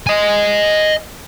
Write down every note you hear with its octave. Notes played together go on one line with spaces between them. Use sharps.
D#5 G#5